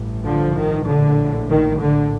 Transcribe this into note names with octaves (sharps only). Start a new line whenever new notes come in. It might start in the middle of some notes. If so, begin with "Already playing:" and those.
Already playing: A1 G2
D3 F3
D#3
A#1 A2 D3
D#3
D3